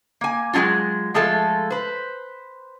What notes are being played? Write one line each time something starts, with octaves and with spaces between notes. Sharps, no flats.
A#3 G#5
F#3 G#3 C4 C#4 F4
F3 G#3 A3 F4 A4
B4 C5